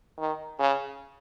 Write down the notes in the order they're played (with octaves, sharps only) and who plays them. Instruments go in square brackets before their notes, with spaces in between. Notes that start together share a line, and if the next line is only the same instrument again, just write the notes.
[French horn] D#3
C#3